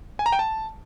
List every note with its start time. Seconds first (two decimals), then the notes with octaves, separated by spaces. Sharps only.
0.19 G#5
0.26 A#5
0.32 G5
0.39 A5